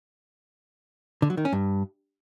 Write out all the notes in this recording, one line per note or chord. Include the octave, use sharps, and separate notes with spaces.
D3
F#3
D#3
C#4
G2